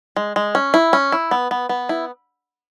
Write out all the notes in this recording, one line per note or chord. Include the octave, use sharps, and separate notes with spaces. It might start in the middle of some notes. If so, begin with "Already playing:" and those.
G#3
G#3
C#4
E4
C#4
E4
B3
B3
B3
E4